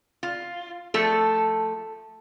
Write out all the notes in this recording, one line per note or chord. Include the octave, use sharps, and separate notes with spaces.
F4
F3 A3 A4